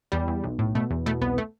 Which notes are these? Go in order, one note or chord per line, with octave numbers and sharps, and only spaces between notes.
E2 G3
E2
B1
A2
B2 A3
E2
B2 A3
C2 B3
A3